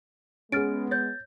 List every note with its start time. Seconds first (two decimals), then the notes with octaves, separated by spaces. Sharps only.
0.52 G#3 B3 C#4 G#4 F6 A6 D7
0.91 C#5 G6 A6